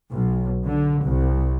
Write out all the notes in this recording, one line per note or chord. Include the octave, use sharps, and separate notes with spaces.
B1
D3
C2